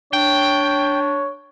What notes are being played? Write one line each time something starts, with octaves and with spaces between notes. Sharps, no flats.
D4 C#5 G5